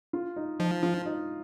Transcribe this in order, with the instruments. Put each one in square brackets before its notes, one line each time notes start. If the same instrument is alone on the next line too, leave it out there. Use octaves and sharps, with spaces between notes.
[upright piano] F4
D#4
[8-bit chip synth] F3 [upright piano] D#4
[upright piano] F4
D#4